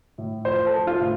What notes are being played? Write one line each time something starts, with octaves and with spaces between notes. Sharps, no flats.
A2
F3 C5
A4
F3
F4
A2